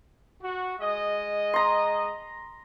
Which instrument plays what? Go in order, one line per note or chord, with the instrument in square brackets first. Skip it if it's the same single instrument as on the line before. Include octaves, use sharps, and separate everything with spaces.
[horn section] F#4
G#3 D#5
[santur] A#5 C6